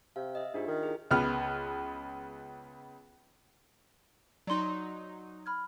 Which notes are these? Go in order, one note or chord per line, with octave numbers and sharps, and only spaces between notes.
C3 F5
D#5 E5
G#2 D4 F4 G4
D#3
E4 G#4
C#2 B3 F6
F#3 D#4 D5 C6
B5 F6 G#6